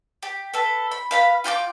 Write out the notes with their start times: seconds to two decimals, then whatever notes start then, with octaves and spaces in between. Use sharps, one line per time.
0.23 G4
0.54 A4 B4
0.91 B5
1.11 B4 F5 B5
1.44 F4 G5 A5 D6